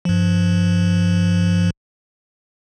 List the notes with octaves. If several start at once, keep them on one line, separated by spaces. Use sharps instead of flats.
G2 F3